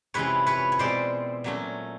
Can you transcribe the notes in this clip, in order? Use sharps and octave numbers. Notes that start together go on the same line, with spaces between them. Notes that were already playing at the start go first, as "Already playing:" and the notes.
F2 C3 E3 G#3 C#4 B4 C#5
B4 C#5
C#5
B2 G#3 C4 C5 D5
A#2 F#3 A3 C#4